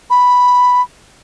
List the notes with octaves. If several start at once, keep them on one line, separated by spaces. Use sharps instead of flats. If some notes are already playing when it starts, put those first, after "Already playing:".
B5